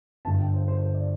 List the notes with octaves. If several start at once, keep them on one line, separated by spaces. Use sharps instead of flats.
G1 G2 D3 A5
G5
C5
C5
C5
D5